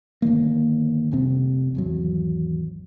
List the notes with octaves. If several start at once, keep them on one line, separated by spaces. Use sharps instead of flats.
G1 D#3 A#3
F1 C2 C3 C4
G#1 E2 F#3